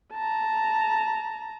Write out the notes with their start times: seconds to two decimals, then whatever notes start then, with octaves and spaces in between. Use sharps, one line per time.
0.14 A5 A#5